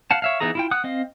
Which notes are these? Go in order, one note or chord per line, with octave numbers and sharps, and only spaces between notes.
F5 F#5 A5
C#5 E5 F5
E3 B3 D#4 G#4 A#5
E4 F4 G5
F#5 D#6 F#6
C4 D#5 F5